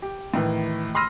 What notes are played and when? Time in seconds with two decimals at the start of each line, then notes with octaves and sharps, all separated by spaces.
0.02 G4
0.34 A2 D#3 E3
0.95 B5 C6 E6 F6 A#6 D#7